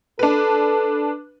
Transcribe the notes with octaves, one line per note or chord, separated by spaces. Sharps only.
D4 A4 B4